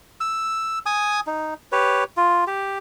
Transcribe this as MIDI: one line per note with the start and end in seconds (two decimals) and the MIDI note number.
0.21 0.79 88
0.86 1.20 80
0.86 1.20 87
1.27 1.54 63
1.72 2.04 67
1.72 2.04 71
1.72 2.04 73
2.17 2.44 65
2.47 2.78 67